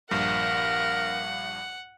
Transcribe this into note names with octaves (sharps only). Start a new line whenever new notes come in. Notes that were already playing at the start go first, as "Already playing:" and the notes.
A#1 G2 A#4 F5 F#5